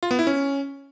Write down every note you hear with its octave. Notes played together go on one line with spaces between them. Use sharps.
F4
B3
E4
C#4